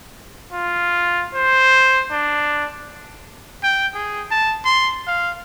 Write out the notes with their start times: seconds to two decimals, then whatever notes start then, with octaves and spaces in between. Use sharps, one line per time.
0.52 F4
1.35 C5
2.12 D4
3.64 G5
3.94 G#4
4.31 A5
4.65 C6
5.07 F5